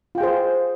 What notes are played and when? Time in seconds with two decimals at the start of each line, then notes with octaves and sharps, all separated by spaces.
0.15 F4
0.18 G5
0.21 G#4
0.23 C5